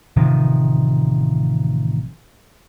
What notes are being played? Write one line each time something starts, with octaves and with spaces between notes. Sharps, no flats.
A1 C3 D#3 F3